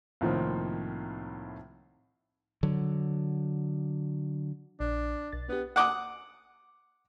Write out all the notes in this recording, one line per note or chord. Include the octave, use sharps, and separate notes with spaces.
C2 A2 D#3 F3 A#3 C4
D3 F#3
A#1 D4
B1 A6
B3 D4 G4
F#5 D6 D#6